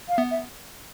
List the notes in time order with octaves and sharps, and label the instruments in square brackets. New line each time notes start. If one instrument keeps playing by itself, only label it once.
[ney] F5
[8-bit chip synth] B3 [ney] E5
[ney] E5